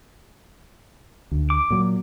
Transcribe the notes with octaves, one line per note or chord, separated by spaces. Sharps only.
D2
D6
A#2 F#3